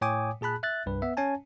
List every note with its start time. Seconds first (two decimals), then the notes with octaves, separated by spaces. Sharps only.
0.01 A2 C#5 G5 G#5 D6 D#6
0.41 A#2 G#4 A5 B5 F#6
0.63 E5 F#6 A6
0.86 C2 G2 B4
1.02 B3 E5
1.17 C#4 C#5 G#5 A5